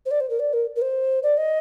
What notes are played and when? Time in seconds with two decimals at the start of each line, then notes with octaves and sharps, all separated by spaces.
0.06 C5
0.11 D5
0.20 C5
0.30 A#4
0.39 D5
0.53 A#4
0.76 A#4
0.81 C5
1.23 D5
1.37 D#5